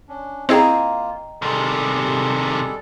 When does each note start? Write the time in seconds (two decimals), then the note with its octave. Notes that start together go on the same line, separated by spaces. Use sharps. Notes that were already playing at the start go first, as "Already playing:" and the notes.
0.09 C#4 D4
0.49 A#3 C4 E4 F4 G#4 D#5 G5 A#5
1.42 C3 D#3 G3 G#3 A4